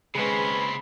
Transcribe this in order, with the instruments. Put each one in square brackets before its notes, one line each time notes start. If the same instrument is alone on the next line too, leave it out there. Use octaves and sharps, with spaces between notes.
[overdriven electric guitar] C#3 C4 [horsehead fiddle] G#3 C#4 [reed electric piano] G#4 B4 [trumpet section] B5